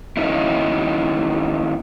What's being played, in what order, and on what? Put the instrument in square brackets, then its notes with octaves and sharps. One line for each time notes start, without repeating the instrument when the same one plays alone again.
[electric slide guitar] D#3 A#3 C#4 D#4 E4